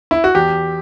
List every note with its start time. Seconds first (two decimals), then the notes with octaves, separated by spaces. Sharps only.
0.11 E4
0.24 F#4
0.35 E2 G4